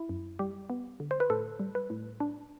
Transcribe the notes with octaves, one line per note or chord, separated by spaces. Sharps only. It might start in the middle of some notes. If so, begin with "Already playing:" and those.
Already playing: E4
F#2
G3 G4
B3
D3
C5
B4
A2 A4
G3
B4
A2
D4